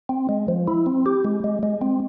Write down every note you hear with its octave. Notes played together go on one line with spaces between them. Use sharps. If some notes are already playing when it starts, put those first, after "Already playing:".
C4
G#3
F3
E4
C4
G4
G#3
G#3
G#3
C4